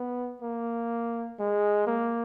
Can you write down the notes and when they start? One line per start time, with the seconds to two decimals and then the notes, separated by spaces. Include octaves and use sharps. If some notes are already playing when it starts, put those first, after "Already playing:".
Already playing: B3
0.42 A#3
1.39 G#3
1.87 A#3